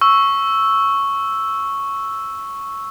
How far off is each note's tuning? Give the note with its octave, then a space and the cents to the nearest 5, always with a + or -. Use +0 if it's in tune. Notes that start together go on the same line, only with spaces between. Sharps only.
C#6 +0 E6 +0